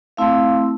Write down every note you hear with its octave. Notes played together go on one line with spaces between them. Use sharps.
A3 C4 E4 F5